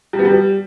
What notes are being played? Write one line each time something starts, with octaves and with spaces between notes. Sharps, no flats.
G3
B3
G3